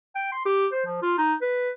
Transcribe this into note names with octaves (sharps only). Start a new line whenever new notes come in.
G5
C6
G4
C5
F3
F4
D#4
B4